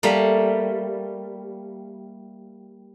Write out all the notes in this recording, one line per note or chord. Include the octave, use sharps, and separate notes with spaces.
G3 A3 A#3